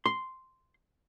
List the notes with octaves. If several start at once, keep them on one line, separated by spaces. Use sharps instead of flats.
C6